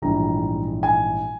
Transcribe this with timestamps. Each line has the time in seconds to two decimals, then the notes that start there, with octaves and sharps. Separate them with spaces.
0.02 A#1 G#2 E3 G3 A#5
0.83 G#5